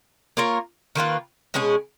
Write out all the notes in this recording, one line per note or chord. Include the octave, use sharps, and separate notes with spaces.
A#3 F4 A#4 C#5
D#3 A#3 F4 B4
B2 G#3 C#4 G#4